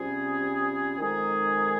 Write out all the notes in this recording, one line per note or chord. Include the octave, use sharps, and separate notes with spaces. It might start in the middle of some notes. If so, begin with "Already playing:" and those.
Already playing: C3 G3 C#4 F4 G#4
F2 D#3 G#3 D#4 G#4